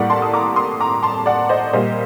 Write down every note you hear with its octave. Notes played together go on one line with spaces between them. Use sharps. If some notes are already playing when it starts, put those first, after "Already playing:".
Already playing: A2 G3 A#3 D5 F#5
A5 C6
D#6
A#5 D6
C6 D#6
A#5 D6
A5 C6
D5 F#5
C5 D#5
A#2 G3 A#3 C5 D#5